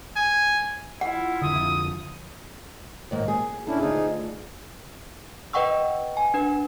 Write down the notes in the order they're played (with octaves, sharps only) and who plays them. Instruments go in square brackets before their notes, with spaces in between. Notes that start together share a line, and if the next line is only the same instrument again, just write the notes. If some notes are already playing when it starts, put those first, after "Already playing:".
[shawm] G#5
[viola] E4 F4 [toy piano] F#5
[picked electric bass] F2 D3 [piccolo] D#6
[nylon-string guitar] D#2 G#2 A#3
G#4
[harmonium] C#4 D4 E4 [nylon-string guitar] A4
[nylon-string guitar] D2 F4 [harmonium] D#4 G#4
[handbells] B4 D#5 F#5 G5 C#6 E6
G#5
D4 B4